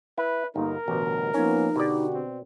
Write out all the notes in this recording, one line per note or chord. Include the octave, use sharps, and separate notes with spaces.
E4 B4
G1 A#3 D#4 A#4
A1 D2 G2 B2
F3 A#3 B3 C#4 D#4
B2 D3 F#4 G4 D5
C4